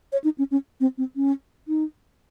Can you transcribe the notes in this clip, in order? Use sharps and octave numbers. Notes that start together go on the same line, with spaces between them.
C#5
D#4
C#4
C#4
C4
C4
C#4
D#4